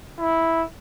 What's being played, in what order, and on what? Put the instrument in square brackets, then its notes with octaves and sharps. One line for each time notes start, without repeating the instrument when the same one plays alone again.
[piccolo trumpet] E4